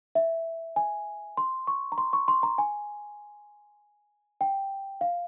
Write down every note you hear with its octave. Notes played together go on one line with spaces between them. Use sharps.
E5
G#5
C6
C#6
A#5
C6
C#6
C6
A#5
G#5
G5
F5